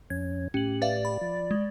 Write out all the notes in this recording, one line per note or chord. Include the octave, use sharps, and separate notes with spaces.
F2 C#4 G#6
A2 C#4 G4 F#7
B4 D5 E5 F5
B5
F3
G#3